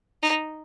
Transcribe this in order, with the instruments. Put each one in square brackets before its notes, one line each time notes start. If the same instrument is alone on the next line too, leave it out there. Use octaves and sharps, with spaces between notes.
[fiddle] D#4